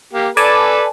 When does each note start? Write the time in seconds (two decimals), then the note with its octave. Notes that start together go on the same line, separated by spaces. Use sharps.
0.13 A#3 G4
0.37 A4 B4 D5 G#5 A5